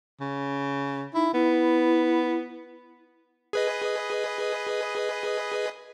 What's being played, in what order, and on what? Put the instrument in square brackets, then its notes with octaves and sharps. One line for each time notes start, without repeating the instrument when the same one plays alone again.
[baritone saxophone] C#3
[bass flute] D#4 [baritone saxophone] E4
[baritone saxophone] B3 [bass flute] E4
[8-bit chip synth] G#4 B4 D#5